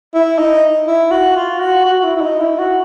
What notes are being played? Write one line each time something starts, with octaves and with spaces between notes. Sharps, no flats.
E4
D#4
E4
F#4
F4
F#4
F#4
E4
E4
D#4
E4
F#4